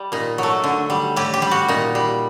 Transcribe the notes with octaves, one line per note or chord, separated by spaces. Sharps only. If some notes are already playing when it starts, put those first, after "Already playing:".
Already playing: G3
A#2 D#4
F#3 A3
D3
G3
A2 G4
G4
G3
F#4
A#2 D#4
G3